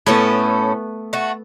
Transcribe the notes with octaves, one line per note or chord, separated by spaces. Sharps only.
A2 A3 B3 C#4 A4
A3 F#4